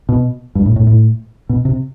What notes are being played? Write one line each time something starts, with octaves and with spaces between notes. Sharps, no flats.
B2
G2
A2
A2
A2
B2
C3